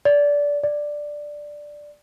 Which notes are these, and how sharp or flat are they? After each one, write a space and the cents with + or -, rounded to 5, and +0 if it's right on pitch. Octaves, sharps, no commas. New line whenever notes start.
D5 -20
D5 +5